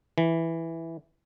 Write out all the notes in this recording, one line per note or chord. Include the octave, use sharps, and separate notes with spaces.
E3